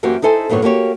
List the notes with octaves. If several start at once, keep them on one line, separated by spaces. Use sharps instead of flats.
F#2 E3 A#3 F#4 G4 C5
D#4 E4 A4 C5 G#5
G2 A#2 D#3 B3 C#5
A#3 F#4 G4 C#5